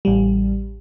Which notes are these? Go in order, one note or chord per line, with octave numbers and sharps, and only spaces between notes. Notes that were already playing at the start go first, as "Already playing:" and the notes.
A1 G3